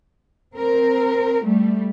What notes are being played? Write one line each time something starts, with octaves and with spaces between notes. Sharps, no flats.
C4 A#4
G3 A3